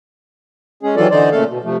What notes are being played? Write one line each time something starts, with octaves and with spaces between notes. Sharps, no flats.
G#3 C#4 G#4
D#3 E3 F#3 F4 A4 D5
D3 E3 D#4 C5 D5
A#2 C#3 A3 A4 F5
B2
C3 F3 A3